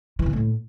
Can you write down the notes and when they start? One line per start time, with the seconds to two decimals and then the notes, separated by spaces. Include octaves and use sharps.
0.19 E3
0.26 C3
0.33 A2